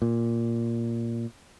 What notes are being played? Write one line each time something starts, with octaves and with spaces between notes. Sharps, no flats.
A#2